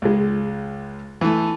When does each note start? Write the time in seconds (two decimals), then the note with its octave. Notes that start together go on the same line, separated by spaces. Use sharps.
0.02 C#2 G#3
1.21 E3 A3